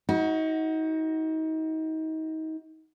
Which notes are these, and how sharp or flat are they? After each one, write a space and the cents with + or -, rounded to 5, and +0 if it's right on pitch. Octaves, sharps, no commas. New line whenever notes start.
D#4 +30 F#4 +5